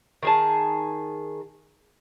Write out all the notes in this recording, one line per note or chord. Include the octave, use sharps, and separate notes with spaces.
D#3 G#4 A5